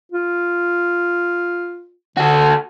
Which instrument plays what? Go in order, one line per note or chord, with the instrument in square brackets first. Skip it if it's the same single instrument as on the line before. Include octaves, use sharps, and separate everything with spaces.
[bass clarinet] F4
[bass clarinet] D3 [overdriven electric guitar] F#4 A4